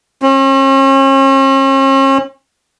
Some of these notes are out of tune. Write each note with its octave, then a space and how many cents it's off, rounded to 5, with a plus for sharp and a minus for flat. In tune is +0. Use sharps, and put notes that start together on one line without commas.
C#4 -45